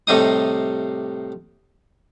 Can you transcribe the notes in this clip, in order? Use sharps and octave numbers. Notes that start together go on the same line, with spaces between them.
A2 C3 G3 D#4 D#6